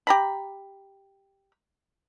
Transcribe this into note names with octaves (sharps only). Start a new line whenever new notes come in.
G4 A#5 B5